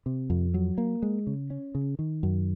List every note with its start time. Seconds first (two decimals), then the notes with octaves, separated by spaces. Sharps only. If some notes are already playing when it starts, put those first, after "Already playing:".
0.06 C3
0.30 F2
0.54 F#3
0.78 A#3
1.02 G#3
1.27 C#3
1.50 C#4
1.75 C#3
1.99 D#3
2.23 F#2